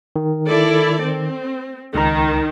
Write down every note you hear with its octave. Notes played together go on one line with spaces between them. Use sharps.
D#3
E4 A4 D5
C4
C#2 D#3 A#5